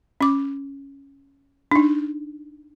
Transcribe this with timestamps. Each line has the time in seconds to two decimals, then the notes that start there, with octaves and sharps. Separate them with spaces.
0.21 C#4 D6
1.72 D4 D#4